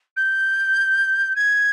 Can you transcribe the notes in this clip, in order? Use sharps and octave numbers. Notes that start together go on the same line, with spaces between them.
G6
G#6